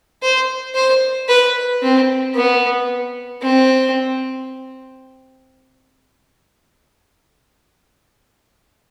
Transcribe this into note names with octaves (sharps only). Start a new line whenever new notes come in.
C5
C5
B4
C4
B3
C4